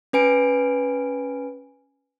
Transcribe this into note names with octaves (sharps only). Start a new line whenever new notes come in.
C#4 B4 G#5 D7